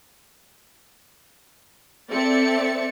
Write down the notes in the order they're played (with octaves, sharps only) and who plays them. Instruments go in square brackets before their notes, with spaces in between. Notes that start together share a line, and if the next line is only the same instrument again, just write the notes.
[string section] C4 A4 D5 E5 A6 C#7